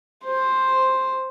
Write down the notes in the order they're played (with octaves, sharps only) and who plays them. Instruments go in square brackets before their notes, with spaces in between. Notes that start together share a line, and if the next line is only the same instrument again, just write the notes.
[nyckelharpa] C5